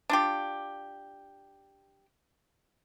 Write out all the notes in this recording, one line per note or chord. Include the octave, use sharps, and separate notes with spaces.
D4 F4 G4